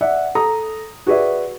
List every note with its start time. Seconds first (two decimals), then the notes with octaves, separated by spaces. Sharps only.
0.01 D5 E5 F#5
0.35 A4 A#5 D#6
1.07 F#4 G#4 B4 D5 E5